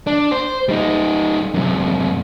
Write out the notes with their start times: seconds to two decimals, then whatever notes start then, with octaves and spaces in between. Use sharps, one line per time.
0.07 D4
0.32 C5
0.69 G3 D#4
1.54 F#2 C3